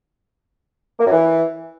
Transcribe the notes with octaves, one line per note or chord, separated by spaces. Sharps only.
A#3
F#2
E3